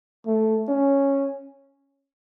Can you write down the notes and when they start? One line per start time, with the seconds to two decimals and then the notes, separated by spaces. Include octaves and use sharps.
0.27 A3
0.68 C#4